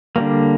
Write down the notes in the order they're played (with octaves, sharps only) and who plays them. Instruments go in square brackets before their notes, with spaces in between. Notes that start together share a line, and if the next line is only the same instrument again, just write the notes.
[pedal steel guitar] D3 G3 A#3